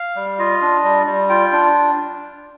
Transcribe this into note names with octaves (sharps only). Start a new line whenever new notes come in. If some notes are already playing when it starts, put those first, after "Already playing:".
Already playing: F5
G3
F4 D#5
D4
G3
G3
F4 G5
D4